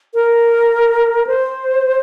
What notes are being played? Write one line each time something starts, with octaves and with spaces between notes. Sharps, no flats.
A#4
C5